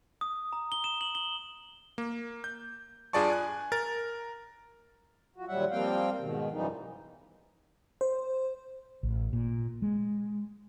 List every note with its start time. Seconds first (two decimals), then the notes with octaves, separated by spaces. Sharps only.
0.21 D#6
0.53 A#5
0.72 G7
0.84 E7
1.01 F#7
1.15 G7
1.98 A#3
2.44 G6
3.13 G2 F4 G#4 D5 A5 C#6
3.30 G#5 F#6
3.72 A#4 A6
5.36 F3 F#4
5.48 D#2 A#2 F#3 G3 E5 F#5
5.71 F3 G3 A#3 C4 F5 G5
6.20 G#2 B2 D#3
6.52 F#2 E3 F3 G3 D#4
8.01 C5
9.03 A1
9.33 A#2
9.82 G#3